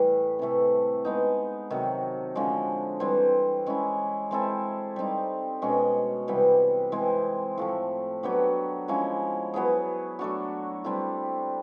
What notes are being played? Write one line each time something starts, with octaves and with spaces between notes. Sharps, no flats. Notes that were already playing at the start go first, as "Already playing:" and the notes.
Already playing: A2 E3 G3
C3 E3 A3
G#3 B3 D#4
C3 D#3 F#3
D3 F3 G#3 C#4
E3 G3 C4
G#3 C#4 E4
G#3 C4 E4 A4
G3 C4 D#4
B2 G#3 C#4 F#4
C3 E3 G3 B3
E3 G#3 C4
A2 F3 A3
F#3 B3 D4 G4
F3 G#3 C#4 E4
F#3 B3 E4 G#4
F#3 A3 D4 F#4
G3 C4 E4 A4